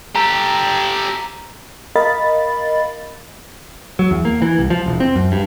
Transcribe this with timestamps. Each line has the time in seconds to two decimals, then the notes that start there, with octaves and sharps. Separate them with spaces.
0.16 G4 A4 A#5
1.96 A#4 D#5 F5 B5 A6
3.99 F#3
4.11 E2
4.25 A#3
4.42 E3
4.59 C2
4.70 F3
4.86 E1
5.00 C4
5.16 F#2
5.32 G2